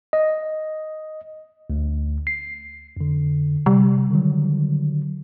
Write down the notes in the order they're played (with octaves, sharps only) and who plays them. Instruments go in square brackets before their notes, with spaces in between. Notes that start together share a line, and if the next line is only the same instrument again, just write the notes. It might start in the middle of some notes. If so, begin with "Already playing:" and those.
[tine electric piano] D#5
D2
C7
F2 D3
[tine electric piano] C3 [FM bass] G3
[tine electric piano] D3 D#3 F#3